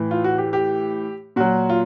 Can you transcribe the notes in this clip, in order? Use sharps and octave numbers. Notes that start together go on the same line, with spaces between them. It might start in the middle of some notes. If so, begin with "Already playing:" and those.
Already playing: A2 E3
F4
F#4
G4
G4
A#2 F#3 F#4
F4